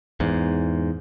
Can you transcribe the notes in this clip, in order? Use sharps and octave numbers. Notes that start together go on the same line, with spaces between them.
E2 G#2